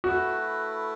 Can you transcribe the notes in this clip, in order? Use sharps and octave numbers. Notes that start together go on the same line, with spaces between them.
A3 E4 F#4 B4